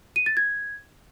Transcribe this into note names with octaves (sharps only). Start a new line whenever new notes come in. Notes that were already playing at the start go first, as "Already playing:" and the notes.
D#7
A6
G#6